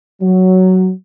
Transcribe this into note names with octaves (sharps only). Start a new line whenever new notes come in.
F#3